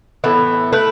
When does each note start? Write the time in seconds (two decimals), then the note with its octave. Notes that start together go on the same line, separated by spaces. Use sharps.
0.24 A2 E3 B3
0.73 A3 E4 B4